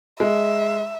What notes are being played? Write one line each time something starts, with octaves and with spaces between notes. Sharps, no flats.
G#3 E5